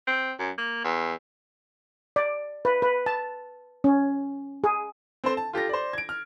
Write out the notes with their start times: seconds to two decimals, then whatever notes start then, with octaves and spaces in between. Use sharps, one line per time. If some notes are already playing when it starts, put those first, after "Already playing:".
0.07 C4
0.39 F#2
0.58 A#3
0.84 E2
2.16 D5
2.65 B4
2.82 B4
3.06 A5
3.84 C#4
4.64 G#4
5.24 C4 A4 C5
5.37 A5
5.53 F4 G4 A4 A#6
5.69 C5 D5
5.93 G#6 D7
6.09 F6